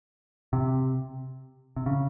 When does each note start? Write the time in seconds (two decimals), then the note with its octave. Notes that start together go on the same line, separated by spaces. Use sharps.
0.53 C3
1.76 C3
1.86 C#3